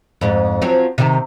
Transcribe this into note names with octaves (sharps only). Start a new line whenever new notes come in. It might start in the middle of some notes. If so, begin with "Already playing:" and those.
F2 G#2
F3 F#3 C4
C3 D#3